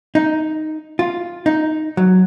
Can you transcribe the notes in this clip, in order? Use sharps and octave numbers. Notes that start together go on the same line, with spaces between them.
D#4
F4
D#4
F#3